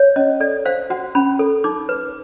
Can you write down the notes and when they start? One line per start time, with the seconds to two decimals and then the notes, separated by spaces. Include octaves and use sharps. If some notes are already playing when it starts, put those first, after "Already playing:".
Already playing: C#5
0.16 C#4 D#5
0.40 A4 D5
0.65 C5 F5
0.90 F#4 F#5
1.15 C#4 B5
1.39 A4
1.64 D#4 D6
1.89 B4